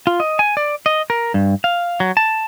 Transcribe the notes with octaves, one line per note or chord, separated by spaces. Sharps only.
F4
D#5
G#5
D5
D#5
A#4
G2
F5
F#3
A5